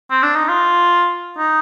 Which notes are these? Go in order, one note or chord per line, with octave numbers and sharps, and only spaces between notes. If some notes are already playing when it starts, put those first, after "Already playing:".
C4
D4
D#4
F4
D#4